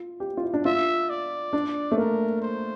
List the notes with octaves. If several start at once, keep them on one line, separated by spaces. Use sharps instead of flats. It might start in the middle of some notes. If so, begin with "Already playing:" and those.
Already playing: F4
G4
F4
E4
D4
F4 E5
D5
D4
A3
A#3 A#4
C5